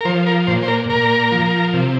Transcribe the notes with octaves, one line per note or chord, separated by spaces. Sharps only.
A#4
F3 C5
A#4
A#2 C5
C5
A#4
A#2 A#4
F3
C3